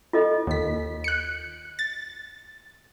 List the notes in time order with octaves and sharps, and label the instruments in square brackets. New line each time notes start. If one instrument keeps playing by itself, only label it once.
[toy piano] F4 A4 D#5
[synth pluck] D#2 B6
F#6 C#7
A6